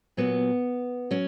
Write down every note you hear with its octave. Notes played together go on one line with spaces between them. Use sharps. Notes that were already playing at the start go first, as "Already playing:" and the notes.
A#2 F#3 B3
F#3 C#4